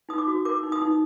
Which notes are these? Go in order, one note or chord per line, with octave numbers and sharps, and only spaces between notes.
D#4 D#6
D6
F#4
A#4 D6
D#4
D#6
D#4